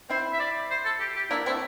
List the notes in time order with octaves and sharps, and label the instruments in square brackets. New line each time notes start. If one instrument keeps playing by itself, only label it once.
[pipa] C4 E4 [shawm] C5
[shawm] E5
D5
C5
A4
G4
G4
[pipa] A#3 D4 [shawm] E4
[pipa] A3 C4 [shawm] E4